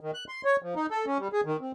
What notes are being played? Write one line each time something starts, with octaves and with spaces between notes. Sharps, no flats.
D#3
F#6
C6
C#5
F3
D#4
A4
C#4
G3
G#4
D#3
C4